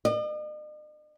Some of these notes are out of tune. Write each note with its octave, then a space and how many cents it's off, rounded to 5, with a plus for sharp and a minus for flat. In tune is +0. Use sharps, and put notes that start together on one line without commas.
D#5 -45